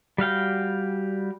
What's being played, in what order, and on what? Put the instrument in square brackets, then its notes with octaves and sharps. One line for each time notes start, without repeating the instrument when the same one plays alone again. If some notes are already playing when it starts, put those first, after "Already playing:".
[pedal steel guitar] G3 F#4 F5 G5